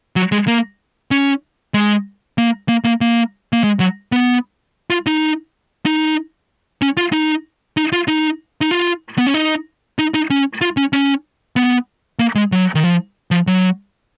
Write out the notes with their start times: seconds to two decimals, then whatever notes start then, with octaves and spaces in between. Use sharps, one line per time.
0.16 F#3
0.32 G#3
0.47 A#3
1.11 C#4
1.74 G#3
2.38 A#3
2.69 A#3
2.84 A#3
3.01 A#3
3.53 A#3
3.64 G#3
3.80 F#3
4.12 B3
4.90 F4
5.07 D#4
5.85 D#4
6.82 C#4
6.97 F4
7.12 D#4
7.77 D#4
7.92 F4
8.08 D#4
8.61 D#4
8.71 F4
9.18 B3
9.27 C#4
9.34 D#4
9.99 D#4
10.14 D#4
10.30 C#4
10.61 F4
10.77 C#4
10.93 C#4
11.56 B3
12.19 A#3
12.35 G#3
12.52 F#3
12.75 D#3
12.84 F3
13.31 F3
13.47 F#3